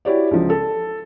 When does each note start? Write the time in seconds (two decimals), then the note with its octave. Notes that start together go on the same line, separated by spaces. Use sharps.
0.05 E4 F#4 G4 C#5 D5
0.31 C#2 F3
0.50 A4